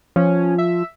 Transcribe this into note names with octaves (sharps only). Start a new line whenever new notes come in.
F3 C#4
E5